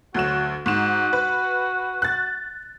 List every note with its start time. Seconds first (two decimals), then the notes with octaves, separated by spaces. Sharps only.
0.15 D2 F#3 F#4 E7
0.66 G#2 F#4 E7
1.13 B4
2.02 F#6 A6